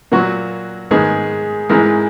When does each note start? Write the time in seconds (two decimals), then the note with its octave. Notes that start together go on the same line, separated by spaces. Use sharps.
0.12 A#2 F#3 A#3 F#4
0.91 G#2 D#3 G#3 B3 G#4
1.69 G#2 E3 G#3 A#4